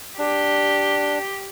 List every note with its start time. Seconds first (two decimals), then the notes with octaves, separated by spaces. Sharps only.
0.18 D4 G4